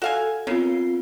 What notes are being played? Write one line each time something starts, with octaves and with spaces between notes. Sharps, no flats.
F#4 A4 F5 G#5
C#3 B3 C4 F4 C7